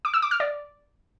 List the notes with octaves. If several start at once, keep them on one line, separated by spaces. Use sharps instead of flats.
D6
E6
D6
F6
D5